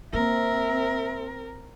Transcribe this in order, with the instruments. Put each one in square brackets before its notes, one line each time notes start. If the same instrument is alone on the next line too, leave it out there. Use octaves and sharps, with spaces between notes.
[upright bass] A#3 [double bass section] C4 [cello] A#4 [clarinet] E5